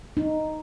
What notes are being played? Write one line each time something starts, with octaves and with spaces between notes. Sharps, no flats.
D#4